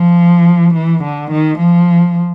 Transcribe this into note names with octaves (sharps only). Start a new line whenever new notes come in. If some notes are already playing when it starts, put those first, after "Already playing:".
Already playing: F3
E3
D3
D#3
F3